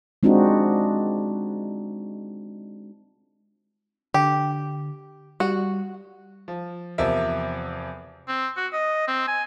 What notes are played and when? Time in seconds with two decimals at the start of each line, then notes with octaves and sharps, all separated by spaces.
0.23 G#3 C4 D4 D#4 F4 F#4
4.14 D3 G4
5.40 G3 F#4
6.48 F3
6.98 E2 C3 F3 A#4 E5
8.28 C4
8.56 F#4
8.73 D#5
9.08 C4
9.27 G#5